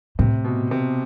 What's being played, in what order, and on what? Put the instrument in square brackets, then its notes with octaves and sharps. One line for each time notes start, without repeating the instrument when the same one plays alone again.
[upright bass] A2 [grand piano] C3
[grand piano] B2
C3